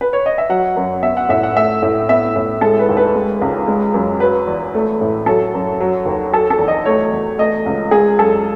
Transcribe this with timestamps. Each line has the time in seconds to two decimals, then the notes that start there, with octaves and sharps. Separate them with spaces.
0.01 B4
0.13 C#5
0.26 D#5
0.38 E5
0.49 F#3 F#5
0.76 F#2
1.03 B3 E5
1.17 F#5
1.29 A2 E5
1.43 F#5
1.56 A3 E5
1.82 A2 E5
2.09 B3 E5
2.36 A2 E5
2.61 G#3 A4
2.79 B4
2.89 D#2
2.97 B4
3.15 G#3
3.42 C#2
3.68 G#3
3.94 F#2
4.20 F#3 B4
4.48 E2
4.75 A3
5.01 A2
5.26 F#3 A4
5.54 F#2
5.80 F#3
6.06 D#2
6.32 F#3 A4
6.50 A4
6.59 E2
6.68 D#5
6.85 A3 C#5
7.12 E2
7.39 A3 D#5
7.66 C#2
7.91 G#3 G#4
8.19 F#2 A4